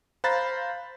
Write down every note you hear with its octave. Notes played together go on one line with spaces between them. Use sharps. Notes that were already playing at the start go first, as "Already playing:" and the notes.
C5 F5 A#5 B5 F#6 A6